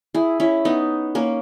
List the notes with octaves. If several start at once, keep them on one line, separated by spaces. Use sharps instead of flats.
E4 G#4
C#4 E4
B3 D#4
A#3 C#4